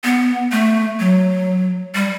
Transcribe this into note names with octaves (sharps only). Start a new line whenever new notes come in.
B3
A3
F#3
G3